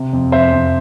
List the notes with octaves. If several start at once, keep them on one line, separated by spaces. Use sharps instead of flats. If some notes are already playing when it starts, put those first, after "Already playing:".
Already playing: C3
F2
F2 C5 E5
F2